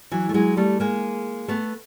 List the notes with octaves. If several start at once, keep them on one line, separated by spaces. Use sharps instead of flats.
E3 F#3
A3
F#3 G#3
G3 A3
G#3 A#3
A3 B3